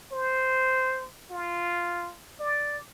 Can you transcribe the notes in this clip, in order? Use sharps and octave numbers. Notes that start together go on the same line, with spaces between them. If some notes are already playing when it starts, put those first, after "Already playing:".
C5
F4
D5